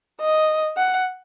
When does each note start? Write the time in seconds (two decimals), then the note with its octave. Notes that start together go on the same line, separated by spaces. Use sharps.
0.20 D#5
0.77 F#5